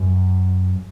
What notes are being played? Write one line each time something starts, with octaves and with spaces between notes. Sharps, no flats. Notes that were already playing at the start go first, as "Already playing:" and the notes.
Already playing: F#2